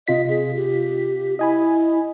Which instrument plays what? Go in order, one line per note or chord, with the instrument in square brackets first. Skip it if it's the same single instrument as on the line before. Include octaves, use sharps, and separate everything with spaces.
[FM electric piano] C3 F4 B6 [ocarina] D#5
[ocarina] G#4
G4
[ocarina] E4 [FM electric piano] D#5 G#5 B5